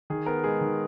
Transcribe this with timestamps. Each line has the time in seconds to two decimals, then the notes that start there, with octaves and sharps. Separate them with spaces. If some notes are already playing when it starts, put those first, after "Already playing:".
0.10 D#3 G#4
0.26 B3 A#4
0.44 G#3 G#4
0.61 D#3